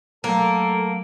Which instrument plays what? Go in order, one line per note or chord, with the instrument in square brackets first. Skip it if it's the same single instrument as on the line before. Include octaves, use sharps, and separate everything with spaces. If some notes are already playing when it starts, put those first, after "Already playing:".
[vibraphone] F#3 A3 [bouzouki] A#3 [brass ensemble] A4